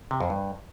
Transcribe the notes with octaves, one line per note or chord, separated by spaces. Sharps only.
C3
F2
G2